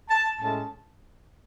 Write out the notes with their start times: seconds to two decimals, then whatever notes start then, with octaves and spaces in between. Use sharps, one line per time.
0.09 A5
0.39 A2 G#3 C#4 A5